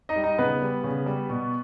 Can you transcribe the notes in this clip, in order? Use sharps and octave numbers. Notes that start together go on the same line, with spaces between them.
D#4 D#5
G3
D#4 D#5
C#3 B3 B4
G3
C#3
G3
B2